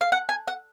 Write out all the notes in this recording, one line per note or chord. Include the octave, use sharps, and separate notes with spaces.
F5
F#5
G#5
F#5